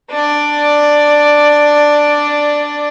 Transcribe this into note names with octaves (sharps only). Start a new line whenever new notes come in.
D4 D5